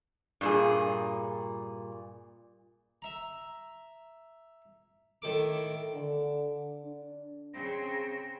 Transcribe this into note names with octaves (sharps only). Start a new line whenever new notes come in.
G2 A#2 G#4
E5 A#5
A2 D#3 A4 D6
D3
D4
C#3 C4 A#6